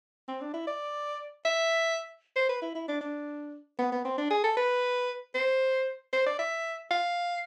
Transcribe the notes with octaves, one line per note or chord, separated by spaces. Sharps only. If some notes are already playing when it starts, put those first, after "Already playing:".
C4
D4
E4
D5
E5
C5
B4
E4
E4
D4
D4
B3
B3
C4
D4
G#4
A4
B4
C5
C5
D5
E5
F5